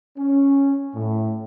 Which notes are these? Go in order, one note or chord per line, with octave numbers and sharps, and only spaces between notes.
C#4
A2